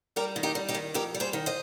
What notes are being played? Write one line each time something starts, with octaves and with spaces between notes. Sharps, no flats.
G3 G4 A#4
D#3
D#4 G4
G3
D#4 G4
D#3
F2 G4 A#4
G3
G#4 C5
D#3
C5 D#5